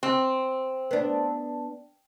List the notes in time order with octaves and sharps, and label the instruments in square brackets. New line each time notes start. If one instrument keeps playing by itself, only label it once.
[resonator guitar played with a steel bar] C4
[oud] B3 D4